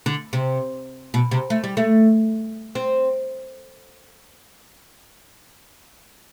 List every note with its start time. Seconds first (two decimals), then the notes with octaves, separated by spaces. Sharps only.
0.06 D3
0.33 C3
1.14 B2
1.31 C3
1.50 A3
1.64 G3
1.77 A3
2.75 C4